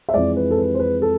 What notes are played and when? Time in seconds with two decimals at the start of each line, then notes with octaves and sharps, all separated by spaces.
0.09 E5
0.13 F2 E3 G#3 D5
0.36 B4
0.51 A4
0.58 B4
0.74 C5
0.79 B4
1.02 A4